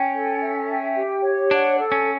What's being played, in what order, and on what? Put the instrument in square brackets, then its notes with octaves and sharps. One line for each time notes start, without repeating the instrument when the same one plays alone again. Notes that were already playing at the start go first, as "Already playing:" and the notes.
Already playing: [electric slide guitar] C#4 [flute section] G5
[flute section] A4
E5
G5
G4
C#5
[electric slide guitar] D4 [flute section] F#5
[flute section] A4
[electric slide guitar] C#4